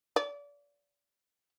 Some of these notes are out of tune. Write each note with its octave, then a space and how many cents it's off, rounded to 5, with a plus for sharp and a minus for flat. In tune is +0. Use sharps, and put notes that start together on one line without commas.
D5 -30